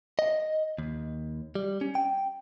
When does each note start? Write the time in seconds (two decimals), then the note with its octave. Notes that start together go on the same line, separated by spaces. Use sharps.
0.19 D#5
0.78 D#2
1.55 G3
1.81 C#4
1.95 G5